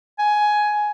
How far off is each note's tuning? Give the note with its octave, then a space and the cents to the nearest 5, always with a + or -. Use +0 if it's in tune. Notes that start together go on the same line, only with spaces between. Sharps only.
G#5 +10